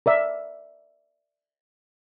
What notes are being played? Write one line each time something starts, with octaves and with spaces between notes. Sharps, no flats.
A#4 D5 E5